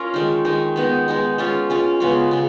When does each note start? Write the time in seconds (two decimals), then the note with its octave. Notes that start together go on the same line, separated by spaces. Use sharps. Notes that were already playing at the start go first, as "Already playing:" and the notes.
Already playing: C#4 F4 A#4
0.14 D#3 G#3 D#4
0.45 D#3 G#3 D#4
0.76 G#3 B3 D#4
1.08 G#3 B3 D#4
1.38 G#3 C#4 F4
1.70 G#3 C#4 F4
2.00 C#3 G#3 B3
2.31 C#3 G#3